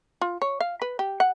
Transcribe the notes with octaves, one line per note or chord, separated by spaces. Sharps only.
F4
C#5
F5
B4
G4
F#5